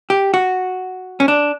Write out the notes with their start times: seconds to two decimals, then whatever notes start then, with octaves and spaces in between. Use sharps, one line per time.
0.10 G4
0.34 F#4
1.20 C#4
1.28 D4